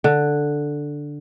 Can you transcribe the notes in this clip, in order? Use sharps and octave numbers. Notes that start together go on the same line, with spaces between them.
D3